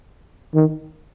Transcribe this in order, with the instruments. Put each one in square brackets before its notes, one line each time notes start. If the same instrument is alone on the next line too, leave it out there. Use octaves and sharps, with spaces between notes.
[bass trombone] D#3